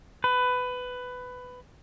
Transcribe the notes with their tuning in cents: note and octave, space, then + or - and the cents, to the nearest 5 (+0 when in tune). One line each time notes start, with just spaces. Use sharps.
B4 +15